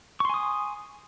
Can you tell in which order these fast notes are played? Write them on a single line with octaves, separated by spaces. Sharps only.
C#6 C6 G#5 D#6